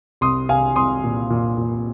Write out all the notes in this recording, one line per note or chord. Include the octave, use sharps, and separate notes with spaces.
C2 C6 D#6
C2 F5 G#5
C2 C6 D#6
A#2
A#2
A#2